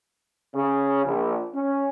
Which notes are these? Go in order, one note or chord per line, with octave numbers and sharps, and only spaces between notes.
C#3
A#1
C#4